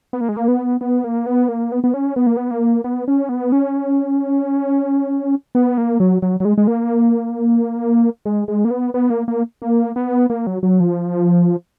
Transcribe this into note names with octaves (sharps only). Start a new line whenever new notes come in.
B3
A#3
G#3
A#3
B3
B3
A#3
B3
A#3
B3
B3
C#4
B3
A#3
B3
A#3
B3
C#4
B3
C#4
B3
A#3
F#3
F#3
F#3
G#3
G#3
A#3
G#3
G#3
A#3
B3
B3
A#3
A#3
A#3
B3
A#3
F#3
F#3
F3